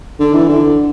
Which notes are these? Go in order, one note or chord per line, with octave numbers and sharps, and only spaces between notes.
D3
E3
D3